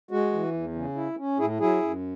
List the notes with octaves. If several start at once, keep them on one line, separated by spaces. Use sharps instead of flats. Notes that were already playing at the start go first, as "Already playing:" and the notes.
G#3 F#4
E3
E2
C#3
E4
C#4
A2 E4 G#4
F#3 E4 G#4
F#2